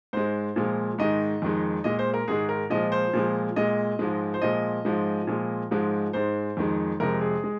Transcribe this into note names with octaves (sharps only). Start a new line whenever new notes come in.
G#2 G#3 C5
A#2 F3 G#3
G#2 D#3 G#3 D#5
F2 D#3 G#3
A#2 G#3 D#5
C5
A#4
G#2 D#3 G#3 G#4
A#4
A#2 F3 G#3 D#5
C5
A#2 F3 G#3
A#2 G#3 D#5
G#2 F3 G#3
C5
A#2 F3 G#3 D#5
G#2 F3 G#3
A#2 F3 G#3
G#2 F3 G#3
G#2 G#3 C5
F2 D#3 G#3
F2 C3 G#3 A#4
G#4
G#3